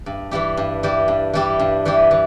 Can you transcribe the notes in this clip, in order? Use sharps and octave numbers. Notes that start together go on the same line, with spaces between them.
G2
E3 G3 E4 G4
G2
E3 G3 E4 G4
G2
E3 G3 E4 G4
G2
E3 G3 E4 G4
E3